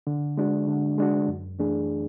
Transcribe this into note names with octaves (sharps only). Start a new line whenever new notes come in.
D3
G#3 D4 F#4
D3
G#3 D4 F#4
F#2
E3 A3 D4 G#4